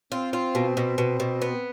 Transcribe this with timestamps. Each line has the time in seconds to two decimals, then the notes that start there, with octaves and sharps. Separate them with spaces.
0.12 C4 F4
0.33 F4
0.55 B2
0.77 B2
0.98 B2
1.20 B2
1.42 B3